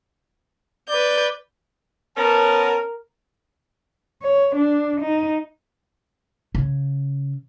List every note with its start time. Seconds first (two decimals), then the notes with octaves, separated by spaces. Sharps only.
0.89 B4 D5 G6
2.17 B3 C#4 A#4 A5
4.22 C#5
4.55 D4
5.01 D#4
6.55 C#3